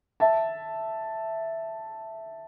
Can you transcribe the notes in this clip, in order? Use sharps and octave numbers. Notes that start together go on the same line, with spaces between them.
E5 A5